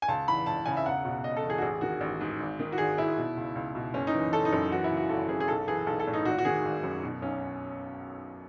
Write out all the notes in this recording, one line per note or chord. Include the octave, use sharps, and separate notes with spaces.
G#5
C#2 A5
E3 B5
C#2 A5
C#3 G#5
E5
E1 F#5
B2
E1 D#5
A4
E2
G#4
F#4
A1 G#4
D#3 F#4
A1
G#2
G#1
D#3
F#4
G#1 G#4
G#2 E4
B2
C#2
C#2
B2
F#1 C#4
D#4
E3
F#1 A4
D#4
F#2
E3 F#4
E4
C#3
F#4
G#1 A4
F#2 G#4
G#4
B1 A4
E3 G#4
B1 A4
A4
A2
D#4
G#1 F#4
F#4
D#3 G#4
G#1
F#2
B2
B1 C#4